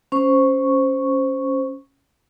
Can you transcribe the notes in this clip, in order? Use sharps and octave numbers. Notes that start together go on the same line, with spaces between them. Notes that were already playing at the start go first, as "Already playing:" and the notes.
C#4 C5 C#6